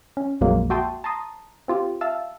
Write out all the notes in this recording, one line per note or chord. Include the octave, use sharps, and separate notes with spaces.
C#4
A#1 F2 F#3 G#3 A#3
F#4 E5 G5 A5 C6 D#6
A5 A#5 C6 D#6
C4 F4 G4
E5 F5 A5 E6